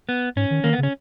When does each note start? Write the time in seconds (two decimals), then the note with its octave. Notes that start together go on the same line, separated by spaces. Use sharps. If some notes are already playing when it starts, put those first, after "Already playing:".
0.09 B3
0.36 G#2 C#4
0.50 D#3
0.64 D#3 A#3
0.73 B3
0.78 C#3
0.83 C#4